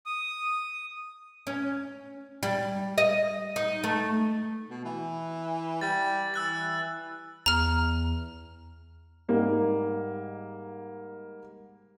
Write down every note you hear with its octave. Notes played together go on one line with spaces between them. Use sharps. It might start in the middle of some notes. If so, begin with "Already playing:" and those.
D#6
C#4
G3
D#5
D#4
A3
B2
E3
G3 A6
E3 E6 F#6 A6
E2 A#5 F6
G#2 G3 A#3 D#4